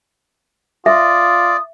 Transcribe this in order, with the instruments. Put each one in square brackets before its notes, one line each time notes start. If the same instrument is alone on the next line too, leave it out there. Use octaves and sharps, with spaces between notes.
[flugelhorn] F4 [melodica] D5 [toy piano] E5 [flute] D#6